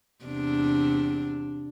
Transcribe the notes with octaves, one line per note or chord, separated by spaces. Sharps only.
E2 C3 D4